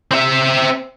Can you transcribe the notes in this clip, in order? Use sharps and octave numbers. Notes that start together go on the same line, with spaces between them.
C4 E5